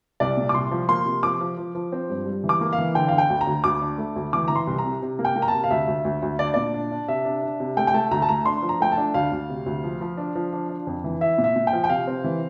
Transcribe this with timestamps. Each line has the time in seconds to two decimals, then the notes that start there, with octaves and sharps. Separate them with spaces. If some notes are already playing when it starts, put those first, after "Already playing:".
0.20 C2 D5
0.37 A#2
0.49 D6
0.54 C2 C6
0.71 F3
0.89 A#3 C6
1.06 C3
1.23 F3 D6
1.41 F3
1.58 F3
1.75 F3
1.92 C4
2.10 G2
2.26 G3
2.44 E3
2.49 D6
2.61 A#3
2.73 F5
2.78 E3
2.95 D3 G5
3.08 D3 F5
3.18 G5
3.30 D2
3.41 A#5
3.47 D2
3.64 D2 D6
3.81 D4
3.98 A3
4.16 D2
4.33 E3 D6
4.48 E3 A#5
4.56 C6
4.67 C2
4.78 A#5
4.85 C3
5.02 C3
5.19 A#3
5.25 G5
5.36 A#3
5.42 A#5
5.48 A5
5.54 C3
5.64 F5
5.70 D2 E5
5.87 D2
6.05 D2
6.22 D2
6.39 D4 D5
6.54 A#2 D5
6.74 D4
6.91 D4
7.08 C3 E5
7.25 D4
7.43 D4
7.60 C3
7.77 A3 G5
7.87 G5
7.94 A3 A5
8.11 D2 A#5
8.22 A5
8.28 A3 A#5
8.46 D4 C6
8.62 F3
8.69 A#5
8.80 A3 G5
8.92 A5
8.97 D4
9.14 D2 F5
9.32 D2
9.49 C3
9.66 D2
9.84 F3
10.01 F3
10.17 D4
10.35 F3
10.53 D4
10.69 D4
10.87 F2
11.04 E3
11.21 E4 E5
11.38 A#2
11.44 E5
11.56 A#2
11.67 G5
11.73 F3
11.84 G5
11.89 C3 F5
12.07 C4
12.24 E3